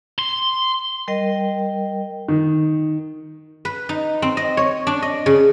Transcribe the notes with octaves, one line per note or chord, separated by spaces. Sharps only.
C6
G3 A#4 D#5 G5
D#3
B4
D#4
C4
D#5
C#5
D4
D#5
C#3